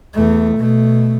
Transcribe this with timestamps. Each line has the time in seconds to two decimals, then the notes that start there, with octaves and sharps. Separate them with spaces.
0.14 E2 A3
0.58 B2 A3